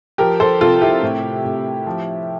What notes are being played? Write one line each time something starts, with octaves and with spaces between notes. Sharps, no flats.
F3 G4 A#4
A4 C5
C3 F4 A4
E4 G4
A2
A2
F3